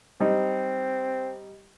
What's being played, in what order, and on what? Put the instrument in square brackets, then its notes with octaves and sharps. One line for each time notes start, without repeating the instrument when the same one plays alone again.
[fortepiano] G3 D#4 [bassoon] C4